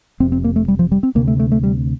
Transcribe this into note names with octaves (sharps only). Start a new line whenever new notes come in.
F1 F2 C3 C4
C4
A#3
A3
G3
F3
G3
C4
D2 C3 A#3
A3
A3
A3
G3